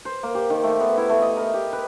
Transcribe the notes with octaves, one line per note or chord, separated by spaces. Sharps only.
C5
A#3
G4
D#3
A3
B3
E4
A3
D#5
A#4
G4
B4